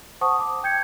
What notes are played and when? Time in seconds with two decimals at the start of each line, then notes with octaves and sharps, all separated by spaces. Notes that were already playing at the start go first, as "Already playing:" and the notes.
0.21 C5 F#5 A5 C#6 D#6
0.39 A5 D6
0.63 G5 G6 G#6 C#7